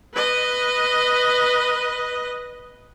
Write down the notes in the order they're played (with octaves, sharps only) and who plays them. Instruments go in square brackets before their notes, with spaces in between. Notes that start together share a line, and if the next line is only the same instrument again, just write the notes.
[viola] B4 D#5